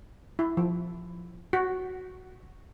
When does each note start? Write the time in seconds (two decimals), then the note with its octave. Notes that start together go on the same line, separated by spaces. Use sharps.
0.39 E4
0.57 F3
1.53 F#4